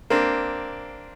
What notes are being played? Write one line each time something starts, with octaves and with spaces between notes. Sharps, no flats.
A#3 C4 D4